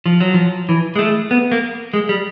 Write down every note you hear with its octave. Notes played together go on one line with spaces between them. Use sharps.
F3
F#3
F3
E3
G#3
A3
B3
A#3
G#3
G3